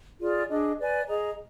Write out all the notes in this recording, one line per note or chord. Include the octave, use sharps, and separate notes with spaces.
F4 G#4 D5
D4 G#4 D#5
B4 D5 G#5
G#4 D#5 A#5